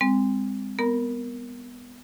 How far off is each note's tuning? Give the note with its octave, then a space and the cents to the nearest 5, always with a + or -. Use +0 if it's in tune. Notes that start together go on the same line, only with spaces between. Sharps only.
G#3 -40 C4 -15
B3 +0 A#4 +0 A#5 +35